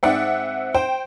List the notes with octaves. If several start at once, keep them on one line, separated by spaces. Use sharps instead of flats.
G#2 C4 D5 E5 F#5 G5
C5 G5